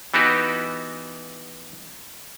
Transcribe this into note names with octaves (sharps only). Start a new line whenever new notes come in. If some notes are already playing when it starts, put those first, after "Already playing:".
E3 B3 D#4 F#4 G4